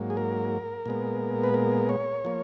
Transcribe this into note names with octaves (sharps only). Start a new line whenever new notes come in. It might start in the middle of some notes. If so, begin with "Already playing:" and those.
Already playing: G#2 F#3 A#3
G#4
A#4
A#2 G#3 B3
B4
A#4
C#5
F3 A#3